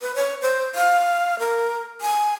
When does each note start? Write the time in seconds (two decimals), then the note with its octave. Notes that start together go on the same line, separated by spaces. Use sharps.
0.01 B4
0.15 C#5
0.42 C5
0.75 F5
1.39 A#4
2.01 G#5